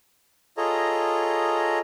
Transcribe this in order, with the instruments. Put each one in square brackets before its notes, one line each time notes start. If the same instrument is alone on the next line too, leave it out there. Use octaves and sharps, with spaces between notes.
[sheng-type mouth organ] F4 G#4 A4 C#5 D#5 A#5